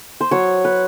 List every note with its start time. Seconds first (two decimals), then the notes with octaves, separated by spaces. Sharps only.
0.21 C5
0.31 F#3 C#5
0.65 B4